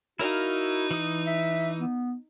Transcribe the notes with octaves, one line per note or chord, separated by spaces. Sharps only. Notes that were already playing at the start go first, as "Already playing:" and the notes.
D#4 E4 F#4 A#4 F5
E3 D#6
E5
B3